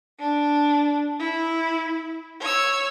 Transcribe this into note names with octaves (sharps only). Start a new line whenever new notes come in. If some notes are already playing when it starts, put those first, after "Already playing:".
D4
E4
C#5 E6